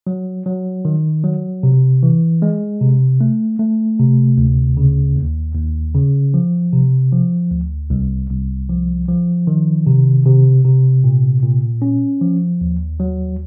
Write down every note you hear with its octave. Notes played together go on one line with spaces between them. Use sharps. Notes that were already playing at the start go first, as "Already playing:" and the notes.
F#3
F#3
D#3
F#3
C3
E3
G#3
C3
A3
A3
C3
D2
C#3
D#2
D#2
C#3
F3
C3
F3
D2
C2
C2
F3
F3
D#3
C3
C3
C3
A#2
A#2
C#4
F3
D#2
F#3